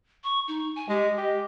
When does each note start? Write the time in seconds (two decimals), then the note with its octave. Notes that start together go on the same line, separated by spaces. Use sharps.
0.24 C#6
0.48 D#4
0.76 G#5
0.89 G#3 G4
1.17 G4 D#5